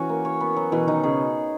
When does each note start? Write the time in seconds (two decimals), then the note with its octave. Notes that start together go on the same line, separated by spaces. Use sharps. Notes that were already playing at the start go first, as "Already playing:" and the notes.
Already playing: E3 C#4 F#4
0.09 A#3
0.25 C#5
0.41 B3
0.56 F#3
0.72 B2 E3
0.87 D#3 D#4
1.03 C#3 G#4